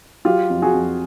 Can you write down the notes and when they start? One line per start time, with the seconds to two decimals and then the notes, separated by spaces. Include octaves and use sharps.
0.25 F#3 F4 G4
0.50 F2
0.62 F#4 G#4
0.74 F2